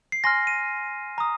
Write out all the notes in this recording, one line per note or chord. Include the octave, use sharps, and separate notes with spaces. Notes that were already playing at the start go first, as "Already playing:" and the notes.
C7
G#5 C6 F6 A#6
D#7
A#5 D#6